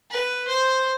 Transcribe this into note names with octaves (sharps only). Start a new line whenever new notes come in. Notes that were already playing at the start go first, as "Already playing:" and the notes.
B4
C5